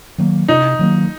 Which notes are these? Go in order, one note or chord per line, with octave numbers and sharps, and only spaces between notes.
D#3 F#3 A#3
C3 D#4
D#3 F#3 A#3